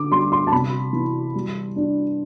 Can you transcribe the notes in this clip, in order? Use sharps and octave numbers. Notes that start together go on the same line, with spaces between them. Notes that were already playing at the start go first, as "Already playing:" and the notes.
Already playing: D3 D6
G3 C6
C6
A5
C3 B5
E3
G3
D4